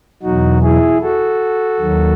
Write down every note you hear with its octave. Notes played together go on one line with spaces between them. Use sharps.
E2 B2 F#3 D#4 F#4
E4 G#4
F#4 A4
D#2 D#3 F#3